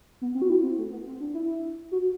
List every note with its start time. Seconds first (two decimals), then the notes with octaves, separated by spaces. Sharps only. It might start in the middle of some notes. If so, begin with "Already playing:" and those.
0.21 B3
0.35 C4
0.42 F#4
0.50 E4
0.63 C4
0.78 A3
0.92 B3
1.07 C4
1.20 D4
1.34 E4
1.92 F#4